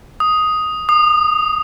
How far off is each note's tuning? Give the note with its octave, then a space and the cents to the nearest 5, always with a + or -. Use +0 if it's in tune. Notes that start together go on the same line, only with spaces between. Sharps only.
D#6 +5
D#6 -35